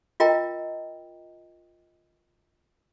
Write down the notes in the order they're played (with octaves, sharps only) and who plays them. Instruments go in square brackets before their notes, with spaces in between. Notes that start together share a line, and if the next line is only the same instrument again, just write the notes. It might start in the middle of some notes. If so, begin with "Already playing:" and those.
[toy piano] F4 A#4 D#5 G5 A#5